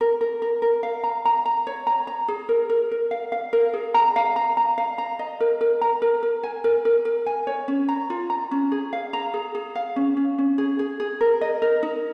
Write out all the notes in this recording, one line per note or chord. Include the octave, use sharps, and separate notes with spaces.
A#4
A#4
A#4
A#4
F5
A#5
A#5
A#5
C#5
A#5
A#5
G#4
A#4
A#4
A#4
F5
F5
A#4
G#4
A#5
F5
A#5
A#5
F5
A#5
D#5
A#4
A#4
A#5
A#4
A#4
G#5
A#4
A#4
A#4
G#5
C#5
C#4
A#5
F4
A#5
C#4
G#4
F5
A#5
G#4
G#4
F5
C#4
C#4
C#4
G#4
G#4
G#4
A#4
D#5
A#4
D#4